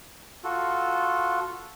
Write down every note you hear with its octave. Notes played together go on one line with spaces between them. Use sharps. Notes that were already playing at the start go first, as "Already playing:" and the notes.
F4 F#4 A4